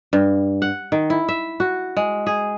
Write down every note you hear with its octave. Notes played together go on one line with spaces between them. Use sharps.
G2
F#5
D#3
E4
E5
F#4
G#3
G#4